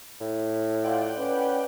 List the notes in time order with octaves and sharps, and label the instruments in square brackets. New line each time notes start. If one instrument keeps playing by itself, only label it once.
[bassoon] A2
[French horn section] F4 [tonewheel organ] D5 F#5 G5
[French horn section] C#4 B4